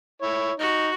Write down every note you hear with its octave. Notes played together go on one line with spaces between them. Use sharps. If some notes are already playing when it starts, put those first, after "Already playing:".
E4 C#5
D#4 F#4